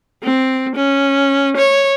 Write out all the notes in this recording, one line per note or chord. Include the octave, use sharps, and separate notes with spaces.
C4
C#4
C#5